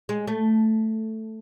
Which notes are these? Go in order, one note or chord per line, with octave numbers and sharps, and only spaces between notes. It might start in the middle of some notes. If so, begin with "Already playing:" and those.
G#3
A3